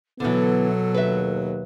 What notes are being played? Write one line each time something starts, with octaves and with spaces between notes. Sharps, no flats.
B2 D3 E3 F#3 B3 A4
D#2 B4 E5